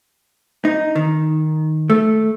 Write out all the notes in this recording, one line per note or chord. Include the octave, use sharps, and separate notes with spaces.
D#4
D#3
A3